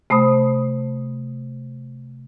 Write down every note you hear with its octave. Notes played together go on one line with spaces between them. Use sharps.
C3 A3 C5 B5 D#6